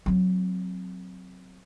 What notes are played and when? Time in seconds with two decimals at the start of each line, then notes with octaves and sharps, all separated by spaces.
0.06 F#3 C4